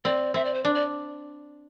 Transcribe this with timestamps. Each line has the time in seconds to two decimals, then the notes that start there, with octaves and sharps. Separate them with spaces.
0.05 C4 D5
0.34 C4 E5
0.45 D5
0.54 C5
0.64 D4 D5
0.75 D5